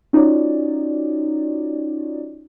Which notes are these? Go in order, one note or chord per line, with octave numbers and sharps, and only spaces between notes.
C#4 D#4 F4 F#4 C#5 D5